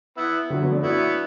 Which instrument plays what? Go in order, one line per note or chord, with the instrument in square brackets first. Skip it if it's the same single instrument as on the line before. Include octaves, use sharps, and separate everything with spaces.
[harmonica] B3 E4
[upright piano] D3 F#3
F#3 B3
A3 D4
[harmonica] B3 E4 [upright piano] D4 F#4